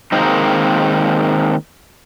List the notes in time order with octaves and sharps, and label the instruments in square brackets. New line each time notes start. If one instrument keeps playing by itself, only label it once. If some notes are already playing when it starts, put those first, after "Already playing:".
[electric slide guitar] D#3 G#3 A#3 C4 D#4